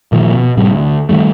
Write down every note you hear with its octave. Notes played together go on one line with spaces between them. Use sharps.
A#2 D#3 F3 A#3
B2
A2 C3 G3
D2
D#3 F3 G3 A3